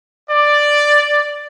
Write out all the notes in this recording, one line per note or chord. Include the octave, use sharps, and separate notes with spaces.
D5